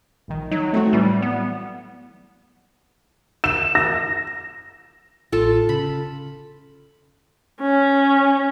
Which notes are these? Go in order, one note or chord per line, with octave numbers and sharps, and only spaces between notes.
A#1 D#3
F#3 D#4
A3 C4 F#4
A2 E3 F#3 G3
B3
E7
A#6
A1 F4 A4
C#3 B5
C#4